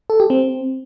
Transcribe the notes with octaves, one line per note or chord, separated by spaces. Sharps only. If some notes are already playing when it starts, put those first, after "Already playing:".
A4
G4
C4